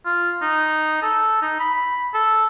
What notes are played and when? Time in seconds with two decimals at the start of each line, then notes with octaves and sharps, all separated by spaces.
0.05 F4
0.41 D#4
1.02 A4
1.42 D#4
1.60 B5
2.14 A4